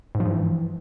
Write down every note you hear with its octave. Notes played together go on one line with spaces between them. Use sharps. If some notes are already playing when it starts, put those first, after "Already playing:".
G#2
F3
G2
E3